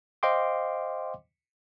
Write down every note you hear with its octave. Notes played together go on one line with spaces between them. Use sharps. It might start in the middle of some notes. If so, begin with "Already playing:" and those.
C5 D#5 F5 G5 C6 D6